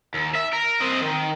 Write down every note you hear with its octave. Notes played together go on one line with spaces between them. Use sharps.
D#2
E5
A#4
C4 D#5
D#3